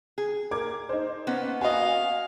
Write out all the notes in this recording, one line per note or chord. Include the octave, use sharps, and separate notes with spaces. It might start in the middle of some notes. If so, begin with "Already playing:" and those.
G#4
A#4 D6 G#6
D#4 C5
A#3 B3 C#4
F#4 D#5 F5 G#5